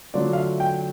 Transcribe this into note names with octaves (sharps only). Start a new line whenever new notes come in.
D3 F#3 A3 D4 F4 D5
F5
E5
G5